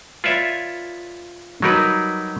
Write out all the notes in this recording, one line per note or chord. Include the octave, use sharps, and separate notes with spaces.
F4 B4 C#5 D5 E5
F#3 G3 D#4 A#4 B4